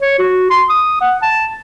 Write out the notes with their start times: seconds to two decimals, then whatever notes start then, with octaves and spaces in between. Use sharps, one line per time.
0.01 C#5
0.19 F#4
0.50 C6
0.69 D#6
1.01 F#5
1.22 A5